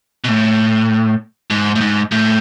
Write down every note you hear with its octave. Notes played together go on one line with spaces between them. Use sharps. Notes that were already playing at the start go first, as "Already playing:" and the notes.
B2
A2
G#2
A2
G#2
A2